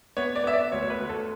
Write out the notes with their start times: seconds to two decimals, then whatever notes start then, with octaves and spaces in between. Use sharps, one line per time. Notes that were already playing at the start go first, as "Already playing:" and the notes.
0.17 B3 C#5
0.36 D5
0.44 B3 E5
0.54 D5
0.72 D2 C#5
0.83 C#5
0.90 B4
1.00 D2
1.09 A4